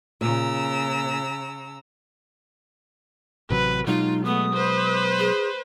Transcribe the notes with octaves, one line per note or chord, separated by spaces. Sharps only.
A#2 C#3 A#5 E6
A1 C3 F#3 B4
B2 F#3 G#3 D#4 F4
A3 B3 D#6
B4 C5
G#4